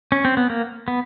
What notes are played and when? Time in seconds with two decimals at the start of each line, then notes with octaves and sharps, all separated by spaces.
0.12 C#4
0.25 C4
0.37 B3
0.50 A#3
0.88 B3